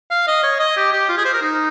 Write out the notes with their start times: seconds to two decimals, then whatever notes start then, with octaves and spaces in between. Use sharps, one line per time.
0.10 F5
0.27 D#5
0.43 C#5
0.59 D#5
0.76 G4
0.92 G4
1.09 F4
1.17 G#4
1.25 C5
1.34 A#4
1.42 D#4